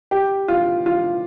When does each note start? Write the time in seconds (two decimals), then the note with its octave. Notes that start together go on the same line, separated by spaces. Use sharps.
0.11 G4
0.48 F4
0.86 F4